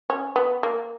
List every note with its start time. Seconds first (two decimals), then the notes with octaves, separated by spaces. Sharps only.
0.10 C#4
0.36 B3
0.63 A#3